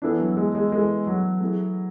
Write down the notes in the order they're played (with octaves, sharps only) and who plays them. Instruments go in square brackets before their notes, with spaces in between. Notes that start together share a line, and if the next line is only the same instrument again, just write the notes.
[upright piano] E3 B3 E4 A4 [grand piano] D4
[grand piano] F#3
G#3
G#3
[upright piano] E3 B3 E4 A4 [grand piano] G#3
[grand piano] F#3
[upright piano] A3 E4 G#4